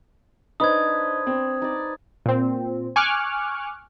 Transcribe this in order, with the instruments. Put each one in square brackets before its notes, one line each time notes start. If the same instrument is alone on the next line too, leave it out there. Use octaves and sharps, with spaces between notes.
[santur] D4 B4 C5 [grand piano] D#4 [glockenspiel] D#6 G#6
[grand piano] C4
[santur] D#4 D5
[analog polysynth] A#2 C4
G#5 C#6 D6 F6 F#6